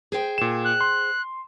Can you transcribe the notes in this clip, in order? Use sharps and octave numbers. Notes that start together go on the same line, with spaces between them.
G#4 C5 G5
A#2 E7
F#6
C6